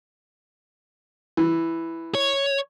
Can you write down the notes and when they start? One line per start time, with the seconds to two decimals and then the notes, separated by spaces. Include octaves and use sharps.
1.37 E3
2.15 C#5